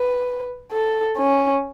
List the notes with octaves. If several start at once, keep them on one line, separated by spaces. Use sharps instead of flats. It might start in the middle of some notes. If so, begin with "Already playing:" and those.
Already playing: B4
A4
C#4